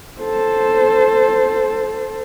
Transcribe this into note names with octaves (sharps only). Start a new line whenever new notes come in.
A4 C5